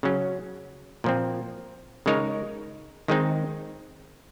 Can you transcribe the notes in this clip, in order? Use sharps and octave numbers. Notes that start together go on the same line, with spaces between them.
C#3 F#3 C#4
A#2 F3 C4
C#3 G#3 D#4 A#4 C#5
D#3 G#3 C4 D#4